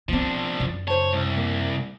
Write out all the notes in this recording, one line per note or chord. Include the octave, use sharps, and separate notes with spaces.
F3 B3 C4 D4
F#2
C#3 C5 C#5 A5
C2
A#3